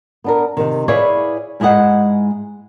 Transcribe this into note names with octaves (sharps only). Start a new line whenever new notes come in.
B3 D4 A#4
C3 D#3
E4 G#4 B4 C#5 D5 F5
G#2 G#3 E4 D#5 F#5